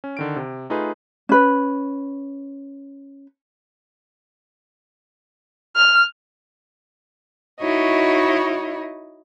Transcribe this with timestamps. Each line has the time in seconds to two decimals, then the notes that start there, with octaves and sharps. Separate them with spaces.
0.04 C#4
0.17 D3 D#3 D7
0.36 C3
0.70 A3 D#4 F4 G#4 B4
1.29 C#4 B4
5.76 F6
7.61 D#4 E4 F#4 C#5 D#5